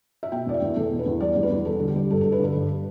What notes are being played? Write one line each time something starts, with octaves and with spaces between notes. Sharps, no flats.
E5
B2 G5
E2 D5
E5
E2
E2 A4
B2
B4
E2
G3 D5
E2
B4
E2
G3 A4
D3
G4
G3
G2 A4
G2 A4
B4
D3 A4
G2